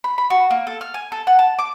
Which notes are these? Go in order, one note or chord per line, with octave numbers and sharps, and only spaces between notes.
B5
B5
F#4
A#3
A4
F6
G#5
A4
F#5
A5
D6